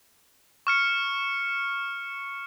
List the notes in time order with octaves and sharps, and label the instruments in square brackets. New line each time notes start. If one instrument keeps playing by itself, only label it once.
[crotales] C#6 F6 C#7